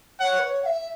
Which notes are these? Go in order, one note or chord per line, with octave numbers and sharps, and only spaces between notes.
C#5 F#5
B4
C#5
F#5
E5